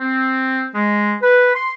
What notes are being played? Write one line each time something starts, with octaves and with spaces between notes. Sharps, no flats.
C4
G#3
B4
C6